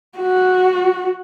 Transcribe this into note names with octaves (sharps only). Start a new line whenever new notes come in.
F#4